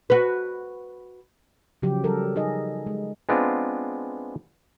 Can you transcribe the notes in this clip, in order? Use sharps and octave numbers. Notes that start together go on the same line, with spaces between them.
F#4 B4
C#3 F3 F#3 G4
F#3 G3 A4 A#4
D#4 G#4 D#5
G#3
G#3 B3 C4 D4 F4